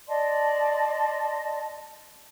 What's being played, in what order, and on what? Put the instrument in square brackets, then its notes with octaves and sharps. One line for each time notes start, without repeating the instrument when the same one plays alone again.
[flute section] D5 D#5 A5 C6